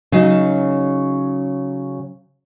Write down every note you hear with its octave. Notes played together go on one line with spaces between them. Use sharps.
C#3 F#3 D#4